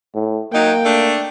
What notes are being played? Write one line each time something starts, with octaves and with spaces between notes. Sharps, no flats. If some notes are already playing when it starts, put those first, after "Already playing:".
A2
F#3 A#3 D#4 G5
A3 D4